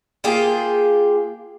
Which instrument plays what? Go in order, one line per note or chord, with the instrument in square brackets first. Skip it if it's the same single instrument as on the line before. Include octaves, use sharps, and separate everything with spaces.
[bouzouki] A#3 F4 G4 G#4